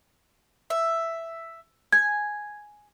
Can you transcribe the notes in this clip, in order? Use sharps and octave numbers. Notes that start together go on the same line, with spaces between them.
E5
G#5 G#6